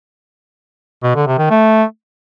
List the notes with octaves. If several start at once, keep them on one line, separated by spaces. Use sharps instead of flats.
B2
D3
C3
D#3
A3